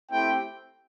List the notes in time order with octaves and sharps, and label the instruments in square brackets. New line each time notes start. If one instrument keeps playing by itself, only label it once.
[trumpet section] A3 C4 E4 G4 G5